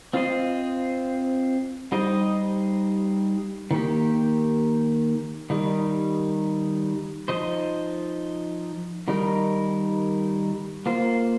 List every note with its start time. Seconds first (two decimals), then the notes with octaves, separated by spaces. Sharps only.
0.13 C4 F4 C5 D#5
1.92 G3 D#4 C5 D#5
3.71 D#3 A#3 G4
5.50 D#3 G3 D#4
7.28 F3 D#4 C5 D#5
9.08 D#3 G3 D#4 A#4
10.86 A#3 F4 C5